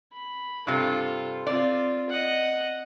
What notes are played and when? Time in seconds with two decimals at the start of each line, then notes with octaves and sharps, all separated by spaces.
0.13 B5
0.67 G2 C3 F4 A4
1.47 C4 F4 D5
2.09 D#5 F#5